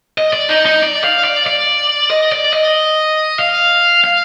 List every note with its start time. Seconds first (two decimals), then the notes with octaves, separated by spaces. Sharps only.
0.18 D#5
0.33 D5
0.49 D#4
0.65 D#4
0.82 D5
1.04 F5
1.24 D5
1.46 D5
2.10 D#5
2.32 D5
2.53 D#5
3.39 F5
4.04 F5